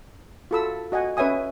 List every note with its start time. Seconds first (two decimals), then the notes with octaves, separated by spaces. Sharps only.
0.51 F4 F#4 A4 B5 E6
0.92 F#4 D#5 F#5 G#5
1.17 C#4 B4 C#5 E5 G#5 D#6